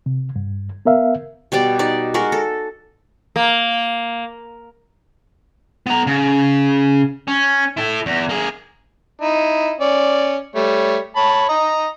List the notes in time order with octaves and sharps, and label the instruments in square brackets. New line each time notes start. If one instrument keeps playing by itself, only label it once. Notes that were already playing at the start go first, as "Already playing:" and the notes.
[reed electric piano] C3
G2
B3 A#4 E5 F5
[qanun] B2 G3 G4 D5
D#4 D5
G#3 F#4 A#4
A4
[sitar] A#3
[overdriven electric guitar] B3 A#5
C#3
C#4
E4 A4
E2
A#3 G#4
[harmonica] D#4 E4
C#4 D5
G3 A3 C#5
C#5 A5 B5
D#5 A#5